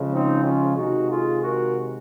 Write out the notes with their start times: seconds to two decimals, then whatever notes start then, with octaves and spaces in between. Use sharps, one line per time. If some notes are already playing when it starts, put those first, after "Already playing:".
Already playing: C#3 F3 G#3
0.12 C4 D#4
0.44 C#4 F4
0.77 C3 D#3 G#3 D#4 F#4
1.10 F4 G#4
1.43 F#4 A#4